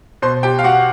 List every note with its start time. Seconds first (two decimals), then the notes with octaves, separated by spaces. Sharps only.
0.22 B2 C5 C6
0.43 G4 G5
0.59 F5
0.64 F#4 F#5